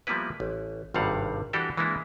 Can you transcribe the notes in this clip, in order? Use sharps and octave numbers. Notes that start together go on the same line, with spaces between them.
F3 G3 A#3 B3 E4 B4
A1
G#1 G2 C3 G3 F5 F#5
E3 G3 D4 F#4 G4 A4
E3 G#3 A#3 D4 E4